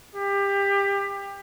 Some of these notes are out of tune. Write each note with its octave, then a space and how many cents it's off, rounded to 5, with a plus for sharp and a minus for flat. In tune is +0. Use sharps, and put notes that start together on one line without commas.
G4 +25